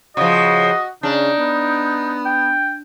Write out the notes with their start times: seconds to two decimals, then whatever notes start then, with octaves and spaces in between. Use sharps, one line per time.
0.17 C#3 F3 F#4 D#5
1.03 C#3 D4 D#4
1.38 B3
2.25 G5